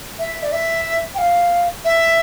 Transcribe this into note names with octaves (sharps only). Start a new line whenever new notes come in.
E5
D5
E5
G5
F5
E5